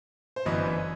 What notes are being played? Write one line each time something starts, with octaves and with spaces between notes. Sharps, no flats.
C5
G1 F#2 E3 B4 D#5